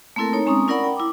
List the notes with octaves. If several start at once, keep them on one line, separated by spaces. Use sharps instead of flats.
A3 A#3 C4 E4 A4 A#4
D#4 C#5 A#5
G#3 C4 C#4 A#5 D#6
C#4 E4 A#4 D5 F#5 B5
G5
E4 D6